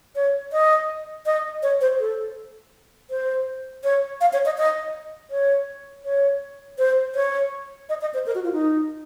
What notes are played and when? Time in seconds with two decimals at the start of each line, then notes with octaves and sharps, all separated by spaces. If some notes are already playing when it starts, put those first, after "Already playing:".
0.16 C#5
0.53 D#5
1.26 D#5
1.63 C#5
1.81 C5
2.00 A4
3.10 C5
3.84 C#5
4.21 F5
4.33 C#5
4.45 D#5
4.58 D#5
5.31 C#5
6.05 C#5
6.78 C5
7.15 C#5
7.89 D#5
8.01 D#5
8.14 C5
8.26 A#4
8.35 F#4
8.44 F4
8.53 D#4